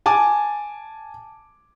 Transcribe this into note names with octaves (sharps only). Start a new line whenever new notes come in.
G#5 A5 D6